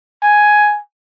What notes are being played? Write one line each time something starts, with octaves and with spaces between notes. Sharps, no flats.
G#5